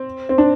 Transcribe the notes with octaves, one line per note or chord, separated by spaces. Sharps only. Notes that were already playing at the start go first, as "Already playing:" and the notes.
Already playing: C4
C4
D4